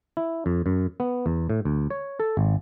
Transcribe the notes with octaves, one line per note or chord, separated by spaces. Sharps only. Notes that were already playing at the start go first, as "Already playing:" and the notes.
E4
F2
F#2
B3
E2
A2
D2
C#5
A4
G#1